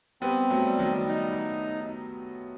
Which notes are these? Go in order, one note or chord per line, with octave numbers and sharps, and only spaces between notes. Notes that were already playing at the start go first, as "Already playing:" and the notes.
G3 B3 C4
F#3 A3
G3
D#3 F#3
D#4